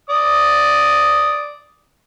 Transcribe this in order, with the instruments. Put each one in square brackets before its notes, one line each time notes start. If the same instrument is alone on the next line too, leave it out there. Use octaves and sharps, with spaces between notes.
[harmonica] D5 D#6